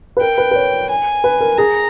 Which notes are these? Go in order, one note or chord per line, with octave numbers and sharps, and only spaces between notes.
B4
A#4 G5
B4
B4
C#5
G#5
B4
A#4
G#4 A#5